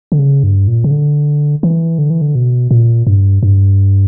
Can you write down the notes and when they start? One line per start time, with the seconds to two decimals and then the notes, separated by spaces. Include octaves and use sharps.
0.12 D3
0.19 C#3
0.43 G2
0.68 A#2
0.84 C#3
0.91 D3
1.63 E3
1.98 D3
2.10 E3
2.21 D3
2.35 B2
2.71 A#2
3.07 G2
3.43 G2